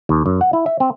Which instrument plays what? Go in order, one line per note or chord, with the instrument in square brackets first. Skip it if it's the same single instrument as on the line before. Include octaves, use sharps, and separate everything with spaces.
[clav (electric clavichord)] D#2
F#2
F#5
E4
E5
C4